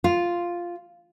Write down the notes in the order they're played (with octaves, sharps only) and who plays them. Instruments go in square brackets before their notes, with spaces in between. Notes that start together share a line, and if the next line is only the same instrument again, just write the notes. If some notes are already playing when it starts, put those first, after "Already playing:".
[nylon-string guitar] F4